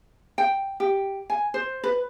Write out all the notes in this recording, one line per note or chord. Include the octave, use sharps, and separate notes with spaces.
G5
G4
G#5
C5
B4